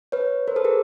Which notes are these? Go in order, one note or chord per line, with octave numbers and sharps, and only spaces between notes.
B4 C#5
A#4 C5
A4 B4
G#4 A#4